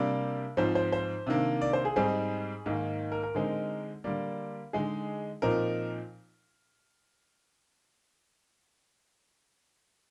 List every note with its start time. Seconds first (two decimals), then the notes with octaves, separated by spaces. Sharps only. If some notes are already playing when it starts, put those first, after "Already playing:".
Already playing: C3 G3 A#3 D4 D5
0.57 G#2 F3 C4 C5
0.75 C5
0.92 C5
1.26 C3 D#3 A#3 D4
1.61 D5
1.73 C5
1.85 G#4
1.96 G#2 G3 C4 D#4 G#4
2.66 G#2 D#3 A#3 D#4
3.12 A#4
3.23 A#4
3.35 D3 G#3 C4 D#4
4.04 D3 G3 A#3 D5
4.73 D3 G#3 D#4 G#4
5.42 A#2 F3 C4 D#4 A#4